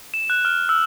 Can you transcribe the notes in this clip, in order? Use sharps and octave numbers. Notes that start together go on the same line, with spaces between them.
E7
F#6
F6
E6